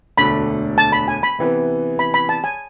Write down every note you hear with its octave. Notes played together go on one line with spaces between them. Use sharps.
E1 D2 D3 A3 D4 B5
A5
B5
G#5
B5
C3 E3 B3
B5
B5
A5
G#5